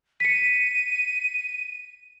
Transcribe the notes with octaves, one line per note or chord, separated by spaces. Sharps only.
B6 C#7 D#7